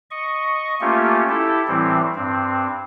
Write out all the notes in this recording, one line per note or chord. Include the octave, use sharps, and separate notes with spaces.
D#5 C#6
A3 A#3 C#4 F4 G4
E4 G4 A4
A2 E3 G3 C4
G2 C4